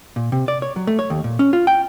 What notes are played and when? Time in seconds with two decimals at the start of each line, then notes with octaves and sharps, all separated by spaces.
0.16 A#2
0.32 C3
0.48 D5
0.62 C#5
0.76 F#3
0.87 A3
0.99 C#5
1.10 D#2
1.24 A#2
1.39 C#4
1.53 F4
1.67 G5